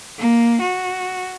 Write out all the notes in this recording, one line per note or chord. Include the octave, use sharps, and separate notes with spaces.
A#3
F#4